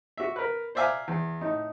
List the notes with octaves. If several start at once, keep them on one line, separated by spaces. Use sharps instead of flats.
F#4 E5
A#4 B4
C5 D5 E5 F5 G#5 A#5
E2
A2 D#4